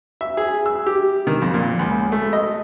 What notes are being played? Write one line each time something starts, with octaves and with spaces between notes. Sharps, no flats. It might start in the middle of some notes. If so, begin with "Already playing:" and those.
E5
G#4
E6
G4
D#3
F2
A#2
C#2
A3
D#5